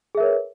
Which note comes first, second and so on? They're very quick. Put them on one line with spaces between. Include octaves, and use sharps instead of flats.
G#4 E5 A#4 C#5 B4